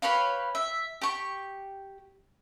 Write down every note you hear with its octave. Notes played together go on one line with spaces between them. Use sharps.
G4 B4 C#5 F5
E5
G4 C#6